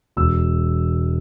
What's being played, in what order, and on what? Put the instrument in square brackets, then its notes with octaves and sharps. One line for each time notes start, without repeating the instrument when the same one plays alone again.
[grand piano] E1 E6